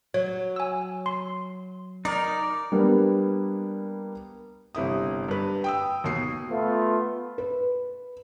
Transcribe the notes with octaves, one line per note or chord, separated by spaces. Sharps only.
F#3 C#5
G#5 E6
C6
D#4 A#4 D5
G3 A#3 B3 D4
G1 C3 E4 D#6
G2 B4
G5 D#6 E6
D#2 B2 D#6 C7
A3 B3 F4
B4